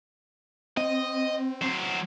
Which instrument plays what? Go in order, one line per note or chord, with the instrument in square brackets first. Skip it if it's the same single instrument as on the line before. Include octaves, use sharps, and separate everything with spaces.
[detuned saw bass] C4 [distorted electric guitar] D#5
[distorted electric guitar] F#3 C5